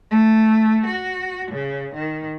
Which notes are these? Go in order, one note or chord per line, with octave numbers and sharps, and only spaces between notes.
A3
F#4
C#3
D#3